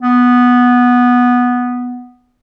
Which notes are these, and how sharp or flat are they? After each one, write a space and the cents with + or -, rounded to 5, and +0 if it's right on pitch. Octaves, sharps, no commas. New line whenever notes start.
B3 -5